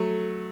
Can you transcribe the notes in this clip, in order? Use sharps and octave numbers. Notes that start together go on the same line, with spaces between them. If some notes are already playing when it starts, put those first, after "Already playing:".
Already playing: F#3 A3